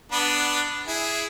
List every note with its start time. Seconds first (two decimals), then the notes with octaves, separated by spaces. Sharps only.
0.12 B3 D4 B4
0.87 E4 G#4